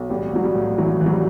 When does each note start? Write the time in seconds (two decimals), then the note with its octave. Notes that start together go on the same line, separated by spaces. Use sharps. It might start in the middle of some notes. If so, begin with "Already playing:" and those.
Already playing: B1
0.10 A1 G3
0.33 A1 F#3
0.44 G3
0.55 A2
0.78 E3 F#3
1.01 E3
1.06 F#3
1.12 G3